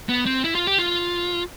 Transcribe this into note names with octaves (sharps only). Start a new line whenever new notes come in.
B3
C4
E4
F4
G4
F4